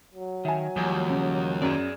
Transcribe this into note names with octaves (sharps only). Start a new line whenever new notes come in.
F#3
D#3 E5 G#5
D#2 F3 G3
C#3
F#2 G#4 D5